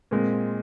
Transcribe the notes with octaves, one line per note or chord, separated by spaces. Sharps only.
A#2 G#3 C4